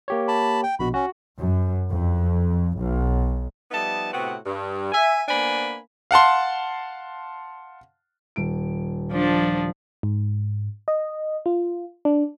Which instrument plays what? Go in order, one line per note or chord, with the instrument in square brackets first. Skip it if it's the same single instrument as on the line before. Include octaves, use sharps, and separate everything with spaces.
[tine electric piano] A#3 G4 C#5
[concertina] A5 B5
G5
[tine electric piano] A#1 B2 [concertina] F#4 B5
[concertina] C#4 [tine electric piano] F#4
[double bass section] F#2
F2
B1
[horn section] F3 G3 B3 D#4 E5 A5
A2 C3 B3 C4 F#4
G2
E5 G#5
A#3 B3 D4 C5 G#5 B5
[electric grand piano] F5 F#5 A5 C6
[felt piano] D#1 D7
[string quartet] F3 D4
[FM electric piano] G#2
D#5
F4
D4